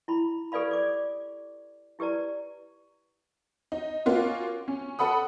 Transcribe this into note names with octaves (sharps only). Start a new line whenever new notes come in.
E4 B5
G4 A4 B4 D5 F5 B5
D5 D6
E4 G4 B4 D5 A#5
D#4
A#3 C#4 F4 F#4
C#4
A4 F#5 B5 D#6